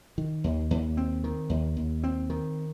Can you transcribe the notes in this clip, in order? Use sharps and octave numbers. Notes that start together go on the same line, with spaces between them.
D#3
D#2
D#2
C4
D#3
D#2
D#2
C4
D#3